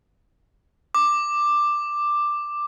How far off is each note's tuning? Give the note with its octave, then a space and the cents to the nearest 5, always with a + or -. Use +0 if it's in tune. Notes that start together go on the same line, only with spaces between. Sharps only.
D6 +10